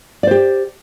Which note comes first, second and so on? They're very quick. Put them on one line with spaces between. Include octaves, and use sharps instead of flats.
D5 C5 G4